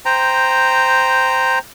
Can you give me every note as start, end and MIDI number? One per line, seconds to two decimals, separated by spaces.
0.05 1.59 72
0.05 1.59 79
0.05 1.59 82